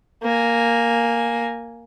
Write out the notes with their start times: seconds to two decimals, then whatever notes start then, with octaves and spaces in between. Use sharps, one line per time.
0.22 A#3 G#5